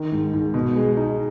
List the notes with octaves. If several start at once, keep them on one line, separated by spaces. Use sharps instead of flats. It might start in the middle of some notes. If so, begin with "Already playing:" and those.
Already playing: D#3
G#2
G#2
B2
G#3
D#4